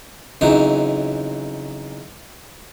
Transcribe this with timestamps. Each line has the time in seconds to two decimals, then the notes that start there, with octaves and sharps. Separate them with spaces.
0.41 F2 C#3 E3 F#3 D#4